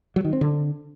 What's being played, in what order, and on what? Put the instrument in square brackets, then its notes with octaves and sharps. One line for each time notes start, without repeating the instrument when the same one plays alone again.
[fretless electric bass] F#3
D#3
C4
D3